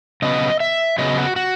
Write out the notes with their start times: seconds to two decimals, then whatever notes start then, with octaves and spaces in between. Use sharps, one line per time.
0.22 C#3 F#3 B3 D#5
0.60 E5
0.98 C#3 F#3 B3 D#5
1.18 F#4
1.36 F#4